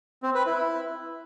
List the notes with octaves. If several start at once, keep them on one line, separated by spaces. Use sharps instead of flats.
C4
B4
E4